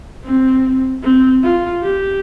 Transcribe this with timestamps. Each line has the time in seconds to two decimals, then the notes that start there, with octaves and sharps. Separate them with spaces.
0.24 C4
1.03 C4
1.43 F4
1.83 G4